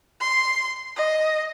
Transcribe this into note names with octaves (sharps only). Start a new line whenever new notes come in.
C6
D#5